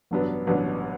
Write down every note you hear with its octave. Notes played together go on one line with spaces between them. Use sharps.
A1 G2 F#3 B3 D4
A1 G2 F#3 B3 D4